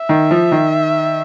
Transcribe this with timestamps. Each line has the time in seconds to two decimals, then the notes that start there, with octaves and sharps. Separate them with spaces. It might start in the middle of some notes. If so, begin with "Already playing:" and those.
Already playing: E5
0.09 D#3
0.31 F3
0.52 D#3